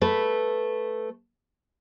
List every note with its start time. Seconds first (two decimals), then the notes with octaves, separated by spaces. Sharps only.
0.01 A3 B4